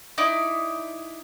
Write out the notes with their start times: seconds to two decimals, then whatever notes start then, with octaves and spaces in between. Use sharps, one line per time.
0.18 D#4 E4 D5